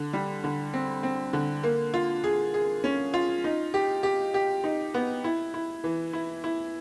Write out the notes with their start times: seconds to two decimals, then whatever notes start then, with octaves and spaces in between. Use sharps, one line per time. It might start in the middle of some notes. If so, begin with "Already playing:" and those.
Already playing: D3
0.13 G3
0.44 D3
0.74 C4
1.03 C4
1.33 D3
1.63 A#3
1.94 F4
2.24 G#4
2.54 G#4
2.84 C#4
3.14 F4
3.44 D#4
3.74 G4
4.03 G4
4.34 G4
4.64 D#4
4.94 B3
5.24 E4
5.54 E4
5.84 E3
6.13 E4
6.44 E4